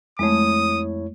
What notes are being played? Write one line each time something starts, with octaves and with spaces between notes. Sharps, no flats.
F2 G#3 A3 E4 C#5 D#6